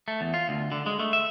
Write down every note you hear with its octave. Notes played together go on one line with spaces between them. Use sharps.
A3
E2
F4
D2
D3
G#3
A3
E5